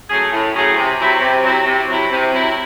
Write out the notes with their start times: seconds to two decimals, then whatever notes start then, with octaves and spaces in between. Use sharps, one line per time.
0.09 F#3 A3 C#4 G#4
0.32 A2
0.54 F#3 A3 C#4 G#4
0.75 C3
0.98 F#3 C4 E4
1.20 C3
1.43 F#3 C4 E4
1.65 C3
1.87 F#3 C4 E4
2.10 C3
2.32 F#3 C4 E4